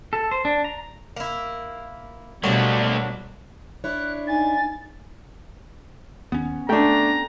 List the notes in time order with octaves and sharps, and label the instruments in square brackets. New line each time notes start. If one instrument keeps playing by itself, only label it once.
[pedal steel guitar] A4
C5
D4
A#5
[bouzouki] A#3 E4
[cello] B2 [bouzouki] F#3 A#3 D4 [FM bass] G3 [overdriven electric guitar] A3 F#4
[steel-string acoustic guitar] D4 E4 C#5 [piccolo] F#6
[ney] D#4 [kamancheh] G#5 [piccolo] A6
[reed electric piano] D#2 [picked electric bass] B3 C#4
[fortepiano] A3 D4 [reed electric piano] A4 G5 [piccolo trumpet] A#5